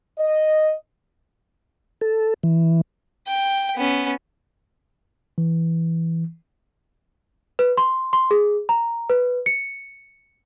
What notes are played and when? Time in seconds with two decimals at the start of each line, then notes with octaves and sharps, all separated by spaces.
0.19 D#5
2.01 A4
2.43 E3
3.27 G5
3.75 B3 C#4
5.38 E3
7.59 B4
7.77 C6
8.13 C6
8.31 G#4
8.69 A#5
9.10 B4
9.46 C#7